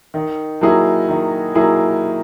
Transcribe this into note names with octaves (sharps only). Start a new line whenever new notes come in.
D#3
F#3 A#3 E4 G#4
D#3
F#3 A#3 E4 G#4